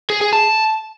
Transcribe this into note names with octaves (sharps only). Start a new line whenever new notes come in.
G#4
G#4
A5